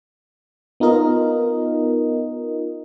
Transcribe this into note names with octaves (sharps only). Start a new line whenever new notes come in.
B3 D#4 F4 A#4 D#5